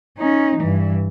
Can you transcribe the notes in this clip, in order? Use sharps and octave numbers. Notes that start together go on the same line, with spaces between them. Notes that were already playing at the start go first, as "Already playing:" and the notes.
C#4 D#4
G2 E3